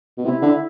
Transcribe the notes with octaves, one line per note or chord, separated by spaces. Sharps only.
B2
C3 E4
D3